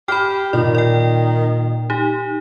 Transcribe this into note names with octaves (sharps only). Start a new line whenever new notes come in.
G4 G5 B5 F6
A#2 D#3 D5
D5 G5
D#4 G4